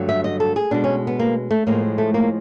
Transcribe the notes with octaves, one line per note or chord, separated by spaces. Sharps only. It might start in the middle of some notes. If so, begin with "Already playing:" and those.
Already playing: G2 D3 F#3 A3
E5
D#5
A4
G#4
B2 G#3 D4
C#4
B3
A#3
A3
A2 F3 G#3 A#3
A3
A#3